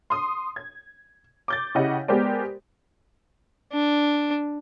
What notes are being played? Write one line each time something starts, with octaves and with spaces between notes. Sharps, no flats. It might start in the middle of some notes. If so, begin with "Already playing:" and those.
C6 D#6
G#6
D6 G6 A6
C#3 E4 G4 D#5 F#5
G#3 B3 G4 A#4 C5 D5
D4